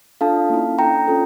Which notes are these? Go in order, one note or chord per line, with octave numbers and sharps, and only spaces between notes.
D4 F4 A4 F5 A5
A#3 C#4 E4
D4 A4 G5 A#5
C#4 F4 A4